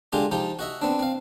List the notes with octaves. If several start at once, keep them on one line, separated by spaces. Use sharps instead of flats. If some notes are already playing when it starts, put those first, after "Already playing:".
D3 G#3 F4 G4
F3 D#4 G4
F#4 D#5 E5
B3 C4 D4
C4 F5